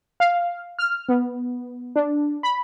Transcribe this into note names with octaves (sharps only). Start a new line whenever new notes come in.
F5
F6
B3
D4
B5